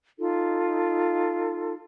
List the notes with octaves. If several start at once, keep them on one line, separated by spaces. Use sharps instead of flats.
D#4 F4 A4